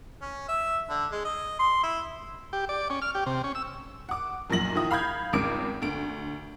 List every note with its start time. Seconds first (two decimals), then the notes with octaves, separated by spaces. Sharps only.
0.22 C#4
0.48 E5
0.89 D3
1.11 G#3
1.25 D#5
1.59 C6
1.83 E4
2.53 G4
2.69 D5
2.90 C#4
3.02 F6
3.15 G4
3.26 C3
3.44 C#4
3.55 E6
4.09 F#5 D6
4.50 B1 F#2 A#2 A#6 F#7
4.75 D#2 F3 E4 D#6
4.91 F5 B5 F6 G6 G#6
5.33 G#1 C#2 C#3 D6 C#7 D7
5.82 D2 D7